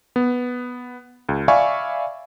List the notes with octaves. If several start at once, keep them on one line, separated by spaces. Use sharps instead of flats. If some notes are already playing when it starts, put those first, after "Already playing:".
B3
C#2
D5 E5 F5 G#5 B5 C#6